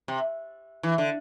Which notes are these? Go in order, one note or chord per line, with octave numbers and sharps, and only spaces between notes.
C3
E3
D3